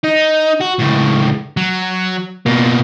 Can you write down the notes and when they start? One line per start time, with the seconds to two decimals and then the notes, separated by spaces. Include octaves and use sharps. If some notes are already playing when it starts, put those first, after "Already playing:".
0.04 D#4
0.60 F#4
0.79 C#2 A2
1.57 F#3
2.46 B2 A#3